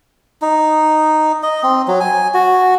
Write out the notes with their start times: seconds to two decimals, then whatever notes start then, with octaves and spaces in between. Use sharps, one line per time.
0.42 D#4
1.43 D#5
1.63 C4
1.88 F#3
2.00 G#5
2.34 F#4